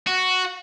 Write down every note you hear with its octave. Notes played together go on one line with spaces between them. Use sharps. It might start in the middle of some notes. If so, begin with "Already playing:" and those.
F#4